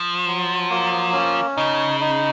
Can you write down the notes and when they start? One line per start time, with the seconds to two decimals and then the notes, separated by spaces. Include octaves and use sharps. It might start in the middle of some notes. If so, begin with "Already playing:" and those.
Already playing: F3
0.26 F#3
0.70 A#3
1.13 C#4
1.57 C#3 D#4
2.00 D#4